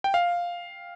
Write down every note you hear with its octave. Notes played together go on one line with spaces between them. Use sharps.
G5
F5